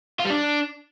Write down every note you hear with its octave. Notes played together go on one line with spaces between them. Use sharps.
F4
G3
D4